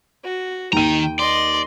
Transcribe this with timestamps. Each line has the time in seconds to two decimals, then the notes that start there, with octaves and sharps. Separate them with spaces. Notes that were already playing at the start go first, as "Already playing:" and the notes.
0.24 F#4
0.73 D#2 D#3 G5 A#5 D#7
1.19 D5 D#5 C6